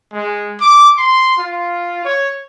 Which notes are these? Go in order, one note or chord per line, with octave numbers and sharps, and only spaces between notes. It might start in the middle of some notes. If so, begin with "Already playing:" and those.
G#3
D6
C6
F4
C#5